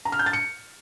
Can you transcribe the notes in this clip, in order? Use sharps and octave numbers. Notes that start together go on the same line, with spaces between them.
A#5
F6
G6
A6
C#7